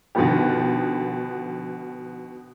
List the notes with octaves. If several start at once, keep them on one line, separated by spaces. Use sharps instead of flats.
B2 D3 D#3 F3 B3 G4